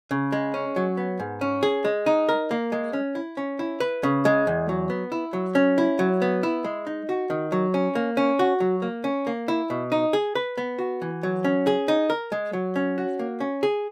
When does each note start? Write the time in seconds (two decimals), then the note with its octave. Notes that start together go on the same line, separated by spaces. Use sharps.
0.11 C#3
0.32 G#3
0.54 C#4
0.76 F#3
0.97 B3
1.20 G#2
1.41 C#4
1.63 G#4
1.85 G#3
2.06 D#4
2.29 A#4
2.51 A#3
2.72 G#3
2.93 C#4
3.15 E4
3.37 C#4
3.59 E4
3.80 B4
4.03 C#3
4.25 G#3
4.47 E2
4.69 F#3
4.90 B3
5.12 E4
5.33 F#3
5.55 C#4
5.78 E4
5.99 F#3
6.22 B3
6.43 E4
6.64 G#3
6.87 D#4
7.09 F#4
7.30 D#3
7.52 F#3
7.74 C#4
7.95 A#3
8.17 C#4
8.39 F#4
8.60 F#3
8.82 A#3
9.04 C#4
9.27 A#3
9.48 E4
9.70 B2
9.92 D#4
10.13 G#4
10.35 B4
10.58 B3
10.79 F#4
11.02 E3
11.23 F#3
11.44 C#4
11.67 G#4
11.88 D#4
12.10 A#4
12.32 G#3
12.53 F#3
12.76 C#4
12.98 F#4
13.19 A#3
13.40 C#4
13.63 G#4